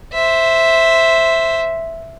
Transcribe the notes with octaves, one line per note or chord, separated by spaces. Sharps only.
C5 E5